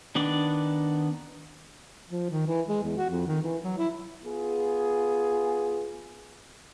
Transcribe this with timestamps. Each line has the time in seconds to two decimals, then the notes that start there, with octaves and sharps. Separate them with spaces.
0.15 D#3 B3 D4 D5
2.10 F3
2.30 D#3
2.46 E3
2.68 G#3
2.83 E2
2.97 F#4
3.10 F2
3.27 D#3
3.42 E3
3.63 F#3
3.78 E4
4.24 B3 F4 G#4